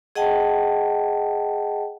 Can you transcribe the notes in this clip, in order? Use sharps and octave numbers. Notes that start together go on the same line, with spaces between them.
G#4 D#5 F#5 G5 A5